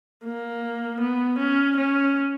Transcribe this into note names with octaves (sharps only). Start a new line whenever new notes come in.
A#3
B3
C#4
C#4